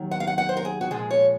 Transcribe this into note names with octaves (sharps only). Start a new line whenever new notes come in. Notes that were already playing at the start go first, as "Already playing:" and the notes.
Already playing: D#2 D#3 F#3
F#5
F5
F#5
F#5
C5
A#4
G#4
F#4
A#2 F3 G#3 G#4
C#5